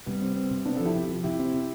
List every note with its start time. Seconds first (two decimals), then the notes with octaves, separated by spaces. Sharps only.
0.06 C3 G3 B3
0.22 C4
0.36 C4
0.51 C3
0.65 B3 C4 D4
0.76 F3 A4
0.85 E4 G4
0.95 C3
1.09 F3
1.24 C3 E4 G4
1.39 C4
1.54 C3